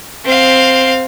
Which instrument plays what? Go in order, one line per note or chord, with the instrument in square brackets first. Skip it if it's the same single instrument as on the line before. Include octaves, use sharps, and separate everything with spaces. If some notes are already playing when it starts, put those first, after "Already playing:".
[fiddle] C4 F5